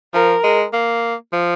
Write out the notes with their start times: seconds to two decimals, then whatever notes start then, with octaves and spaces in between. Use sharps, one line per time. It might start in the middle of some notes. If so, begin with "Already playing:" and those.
0.14 F3 A#4
0.44 G#3
0.73 A#3
1.33 F3